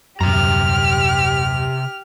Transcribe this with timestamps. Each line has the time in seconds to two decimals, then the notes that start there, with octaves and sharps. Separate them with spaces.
0.21 D#1 F#2 C3 G4 A#5 F6